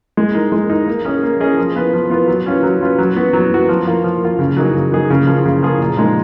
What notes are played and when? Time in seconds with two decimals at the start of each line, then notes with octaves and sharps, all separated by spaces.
0.17 G#3
0.34 D#4 A#4
0.52 G#3
0.70 D#4 A#4
0.88 A#3
1.05 C#4 G#4 D#5
1.23 A#3
1.40 C#4 G#4 D#5
1.57 F3
1.75 B3 F4 B4
1.93 F3
2.10 B3 F4 B4
2.28 F#3
2.46 C#4 F4 B4
2.63 F#3
2.81 C#4 F4 B4
2.99 F#3
3.17 B3 F#4
3.33 F#3
3.52 B3 F#4
3.69 F3
3.86 A#3 F4
4.04 F3
4.22 A#3 F4
4.39 C#3
4.57 F#3 A#3 D#4 G#4
4.74 C#3
4.92 F#3 A#3 D#4 G#4
5.10 C#3
5.27 F3 A#3 F4 G#4
5.45 C#3
5.62 F3 A#3 F4 G#4
5.80 A#2
5.97 F3 G#3 D#4